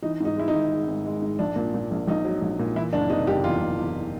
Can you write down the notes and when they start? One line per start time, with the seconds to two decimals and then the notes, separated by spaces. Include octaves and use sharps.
0.02 E3 D#4
0.20 G#2 D#4
0.36 G#3 E4
0.48 D#4
0.54 G#1
0.71 G#3
0.88 G#1
1.06 G#3
1.22 G#2
1.39 A#1 D4
1.56 A#2
1.74 A#2
1.91 A#1
2.08 A#1 D#4
2.25 F#3
2.42 A#1
2.59 A#2
2.76 E3 E4
2.93 F#1 D4
3.10 C3 D#4
3.27 F#1 G4
3.44 E2 F4
3.61 F#1
3.79 E2